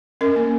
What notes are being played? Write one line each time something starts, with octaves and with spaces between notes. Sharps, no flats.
C#4 A#4
A#3